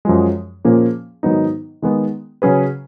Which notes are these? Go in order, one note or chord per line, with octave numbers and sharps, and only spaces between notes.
F#2 F3 G#3
A#2 F3 A#3 C#4 G#4
G#2 D#3 F#3 B3 D#4
D#3 G#3 B3
C#3 F#3 C#4 G#4 B4